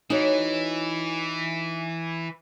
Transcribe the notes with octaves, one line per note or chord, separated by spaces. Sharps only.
E3 D#4 F#4 C#5